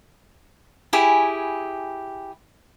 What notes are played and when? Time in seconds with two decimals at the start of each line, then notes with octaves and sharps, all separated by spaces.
0.93 E4 G4 G#4 G#5